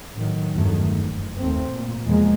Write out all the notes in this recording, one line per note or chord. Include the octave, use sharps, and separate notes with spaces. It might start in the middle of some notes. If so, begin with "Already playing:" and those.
A2 D#3 F#3
E2 G2 D#3 F#3 A3
F#1
D#2 A3 C4
A#2
E2 B2 F3 G#3 A#3